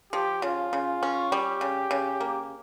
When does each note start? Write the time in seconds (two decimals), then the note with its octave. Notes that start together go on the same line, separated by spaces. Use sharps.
0.13 F3 G4
0.42 C#3 F4
0.73 C#3
1.03 C#4
1.32 G3 G4
1.61 C#3
1.91 C#3
2.20 A#3